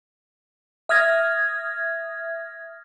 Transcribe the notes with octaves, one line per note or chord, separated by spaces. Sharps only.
E5 D#6 F6 G#6 A#6